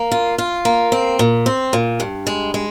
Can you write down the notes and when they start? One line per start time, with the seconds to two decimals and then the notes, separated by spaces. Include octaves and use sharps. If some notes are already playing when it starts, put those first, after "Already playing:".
Already playing: A#3
0.11 F4
0.38 F4
0.65 A#3
0.92 C4
1.19 A#2
1.46 C4
1.73 A#2
2.00 G2
2.27 G#3
2.54 G#3